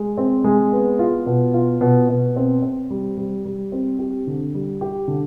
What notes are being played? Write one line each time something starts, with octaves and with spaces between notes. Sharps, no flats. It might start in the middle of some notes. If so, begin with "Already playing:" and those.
Already playing: G#3
C4
G#3
B3
F4
B2
F4
B2
B2
C4
C4
G3
G3
G3
C4
G4
D3
G3
G4
D3